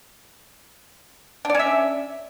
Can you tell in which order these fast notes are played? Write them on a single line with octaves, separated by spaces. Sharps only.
D4 D5 C#4 E5